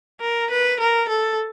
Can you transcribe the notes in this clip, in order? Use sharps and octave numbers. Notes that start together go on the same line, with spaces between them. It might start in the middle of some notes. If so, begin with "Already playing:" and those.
A#4
B4
A#4
A4